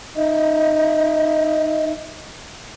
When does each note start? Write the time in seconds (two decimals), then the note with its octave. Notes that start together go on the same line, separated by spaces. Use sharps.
0.16 D#4 D#5 E5